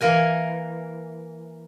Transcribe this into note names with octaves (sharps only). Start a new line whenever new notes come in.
E3 A#3 A#4 G#5